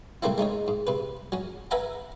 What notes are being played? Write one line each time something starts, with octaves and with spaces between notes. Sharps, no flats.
C3 G3 A3 A#3 C4 E4
G#3 A3 D#4 C#5
G#2
C3 B4
F#3 C#4
B4 E5 F#5 G#5 A#5 B5